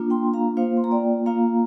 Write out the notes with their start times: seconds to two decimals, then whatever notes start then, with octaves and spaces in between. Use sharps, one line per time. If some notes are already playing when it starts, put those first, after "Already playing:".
Already playing: A#3 D4 F4
0.10 G5 C6
0.34 F5 A#5
0.57 A#3 F4 C5 F5
0.77 C6
0.84 A#5
0.91 D5 G5
1.26 A#3 F4 F5 A#5